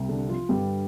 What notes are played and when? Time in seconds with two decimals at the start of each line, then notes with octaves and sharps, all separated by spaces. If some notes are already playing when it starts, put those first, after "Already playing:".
Already playing: C2 G3
0.09 D3 D4
0.29 F3 F4
0.49 G2 D3 G3 G4